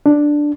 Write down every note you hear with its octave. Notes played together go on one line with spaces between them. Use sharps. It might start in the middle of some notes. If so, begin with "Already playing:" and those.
D4